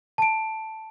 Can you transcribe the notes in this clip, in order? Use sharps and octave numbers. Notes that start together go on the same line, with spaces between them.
A5 D7